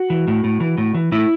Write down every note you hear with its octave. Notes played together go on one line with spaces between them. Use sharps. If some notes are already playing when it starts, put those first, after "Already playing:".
Already playing: F#4
E3
A2
A2
E3
A2
E3
A2 E4